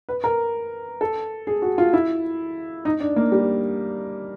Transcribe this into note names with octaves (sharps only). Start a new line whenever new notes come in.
B4
A#4
A4
G#4
F#4
F4
E4
D#4
D4
A#3
G3